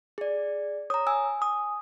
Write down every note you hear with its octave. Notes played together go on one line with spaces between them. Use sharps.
G#4 D5
C#5 A#5 D#6
G#5 E6
D#6